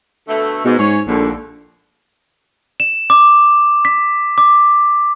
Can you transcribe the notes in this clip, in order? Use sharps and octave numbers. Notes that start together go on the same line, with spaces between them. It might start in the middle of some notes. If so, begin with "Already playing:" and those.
B2 D3 A3
G#2 B2
G#2 C#4 G#4 C#5
A#1 D#2 A2 D3
E7
D6
B6
D6